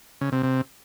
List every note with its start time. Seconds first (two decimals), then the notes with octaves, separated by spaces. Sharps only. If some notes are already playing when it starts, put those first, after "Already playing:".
0.21 C#3
0.32 C3
0.43 C3